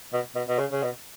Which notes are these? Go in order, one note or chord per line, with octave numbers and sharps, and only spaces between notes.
B2
B2
B2
C#3
C#3
B2